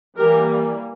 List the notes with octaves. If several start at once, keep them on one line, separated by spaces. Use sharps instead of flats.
E3 G3 A#3 G4 A#4